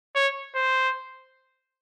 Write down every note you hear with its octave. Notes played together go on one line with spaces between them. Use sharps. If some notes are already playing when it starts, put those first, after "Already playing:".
C#5
C5